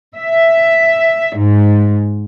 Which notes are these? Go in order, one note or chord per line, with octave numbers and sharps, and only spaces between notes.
E5
G#2